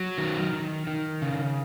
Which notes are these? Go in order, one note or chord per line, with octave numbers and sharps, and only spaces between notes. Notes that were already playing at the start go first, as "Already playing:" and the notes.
Already playing: F#3
D#3
D#3
D#3
C#3